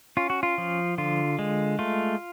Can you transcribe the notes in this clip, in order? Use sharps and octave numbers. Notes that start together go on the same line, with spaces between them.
C#4 F4
F#4
F4
F3
D3 F4
G#3
A3 F4